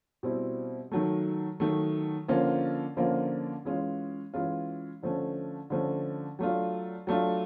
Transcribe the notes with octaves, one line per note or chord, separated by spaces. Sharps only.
B2 G3 C4 E4
D#3 F#3 A3
D#3 F#3 A3
D3 F3 A#3 C#4 F4
D3 F3 A#3 C#4 F4
E3 G#3 C#4 F4
E3 G#3 C#4 F4
D3 F3 A3 C#4
D3 F3 A3 C#4
F#3 A3 D4 F4
F#3 A3 D4 F4